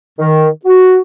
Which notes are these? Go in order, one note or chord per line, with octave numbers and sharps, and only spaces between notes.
D#3
F#4